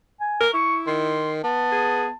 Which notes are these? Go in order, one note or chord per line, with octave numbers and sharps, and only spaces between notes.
G#5
A#4
E4 C#6
D#3 C6
B3 A5
G#4